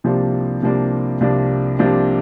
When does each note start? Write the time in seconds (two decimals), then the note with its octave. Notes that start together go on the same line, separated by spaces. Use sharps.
0.04 C2 C3 F3 A#3 D4
0.62 C2 C3 F3 A#3 D4
1.20 C2 C3 F3 A#3 D4
1.79 C2 C3 F3 A#3 D4